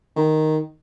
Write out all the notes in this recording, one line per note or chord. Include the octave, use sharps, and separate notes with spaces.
D#3